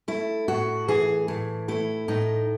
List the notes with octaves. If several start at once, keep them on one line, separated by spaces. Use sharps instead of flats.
A3 E4
A2 F#4
E3 G#4
A2
A3 E4
A2 D#4